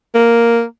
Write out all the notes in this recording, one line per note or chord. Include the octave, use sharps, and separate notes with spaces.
A#3